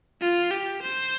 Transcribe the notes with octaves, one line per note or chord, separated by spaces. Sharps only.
F4
G4
C5